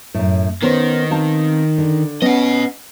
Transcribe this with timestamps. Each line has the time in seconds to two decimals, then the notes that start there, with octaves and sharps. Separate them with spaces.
0.14 F#2 A2
0.63 D#3 B3 C#4 C5
1.11 C4 F5 A5
1.78 D3
2.22 B3 C#4 D#5 F#5